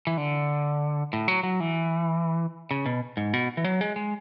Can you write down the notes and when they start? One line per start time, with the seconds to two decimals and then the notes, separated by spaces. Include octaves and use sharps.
0.07 E3
0.17 D3
1.13 A2
1.28 F#3
1.43 F#3
1.60 E3
2.71 C#3
2.86 B2
3.17 G#2
3.33 B2
3.57 E3
3.64 F#3
3.81 G#3
3.96 G#3